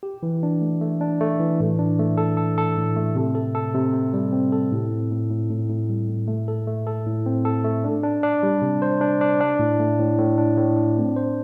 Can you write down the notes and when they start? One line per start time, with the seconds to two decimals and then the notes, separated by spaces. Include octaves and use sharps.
0.03 G4
0.23 E3
0.43 D4
0.62 A3
0.81 A3
1.01 D4
1.21 A3
1.40 E3
1.60 A2
1.79 D4
1.99 A3
2.18 A4
2.37 A4
2.58 A4
2.77 A2
2.96 A3
3.16 C3
3.35 A4
3.55 A4
3.75 C3
3.94 C3
4.14 G3
4.33 C4
4.52 A4
4.72 A2
4.91 C4
5.11 A2
5.30 A2
5.50 A2
5.69 A2
5.89 G3
6.08 A2
6.28 A3
6.48 A4
6.67 A3
6.87 A4
7.06 A2
7.26 C4
7.45 A4
7.64 A3
7.84 D4
8.03 D4
8.23 D4
8.43 G3
8.62 C3
8.82 C5
9.01 D4
9.21 D4
9.40 D4
9.59 A2
9.80 A3
9.99 A2
10.18 A2
10.38 D4
10.58 A2
10.77 D4
10.97 C4
11.16 C5